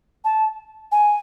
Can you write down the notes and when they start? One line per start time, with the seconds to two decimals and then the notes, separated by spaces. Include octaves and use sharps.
0.25 A5
0.92 G#5